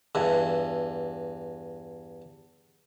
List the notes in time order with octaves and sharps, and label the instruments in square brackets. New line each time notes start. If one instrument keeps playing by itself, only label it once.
[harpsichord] E2 G2